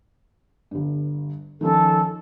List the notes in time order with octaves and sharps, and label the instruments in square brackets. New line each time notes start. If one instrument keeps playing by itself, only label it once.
[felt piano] G1 G2
[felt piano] D#3 F3 C#4 [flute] A4